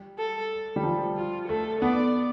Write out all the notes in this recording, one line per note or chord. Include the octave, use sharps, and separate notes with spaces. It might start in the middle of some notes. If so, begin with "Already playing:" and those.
Already playing: G3
A4
G3
F3
F4
A3 A4
B3 D5